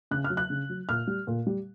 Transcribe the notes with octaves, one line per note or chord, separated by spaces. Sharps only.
C#3 F#6
F6
F#3
F#6
C#3
F#3
A#2 F6
G3
A#2
G3